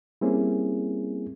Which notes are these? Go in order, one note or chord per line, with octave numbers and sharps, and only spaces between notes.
G3 A#3 C4 C#4 E4 G#4